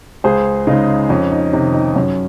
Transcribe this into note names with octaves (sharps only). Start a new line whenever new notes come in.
C#2 G#4 C5
C#3 G#3 D#4
F2 C#4
D#4
C3 D#3 D#4
D#4
F#2 C#4